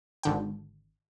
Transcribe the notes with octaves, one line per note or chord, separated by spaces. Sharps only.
G#1 D3 G5